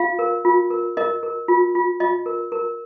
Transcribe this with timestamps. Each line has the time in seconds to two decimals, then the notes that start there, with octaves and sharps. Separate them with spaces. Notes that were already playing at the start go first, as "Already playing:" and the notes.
Already playing: F4 F5
0.19 A#4
0.45 F4
0.70 A#4
0.97 A#4 D#5
1.23 A#4
1.48 F4
1.75 F4
2.00 F4 D#5
2.26 A#4
2.52 A#4